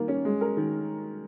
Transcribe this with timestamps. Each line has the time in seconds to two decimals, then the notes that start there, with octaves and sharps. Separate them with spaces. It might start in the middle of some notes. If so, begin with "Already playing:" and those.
Already playing: D#3 A#3
0.08 C#4
0.25 G#3
0.41 A#4
0.57 D#3